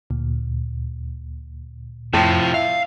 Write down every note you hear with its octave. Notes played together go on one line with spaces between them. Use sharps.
D2 A#2
F2 A2 C3 F3
E5 F5